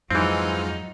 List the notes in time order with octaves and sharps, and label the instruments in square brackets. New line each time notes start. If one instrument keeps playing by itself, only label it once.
[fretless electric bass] F2 G#2 [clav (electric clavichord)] E3 C4 [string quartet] F#3 D#4 [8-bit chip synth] G#3 F4